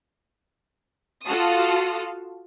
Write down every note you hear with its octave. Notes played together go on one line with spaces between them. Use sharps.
F4 F#4 A4 F5 A5 D#6